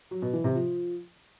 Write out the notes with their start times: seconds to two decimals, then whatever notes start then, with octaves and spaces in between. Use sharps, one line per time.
0.11 F#3
0.22 B2
0.33 E3
0.44 C3
0.55 F3